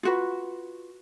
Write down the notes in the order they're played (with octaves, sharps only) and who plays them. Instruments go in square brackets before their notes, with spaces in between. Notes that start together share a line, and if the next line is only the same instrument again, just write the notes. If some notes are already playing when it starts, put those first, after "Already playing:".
[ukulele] F4 F#4 B4